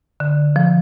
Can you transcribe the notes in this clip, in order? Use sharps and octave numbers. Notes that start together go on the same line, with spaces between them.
D3
F3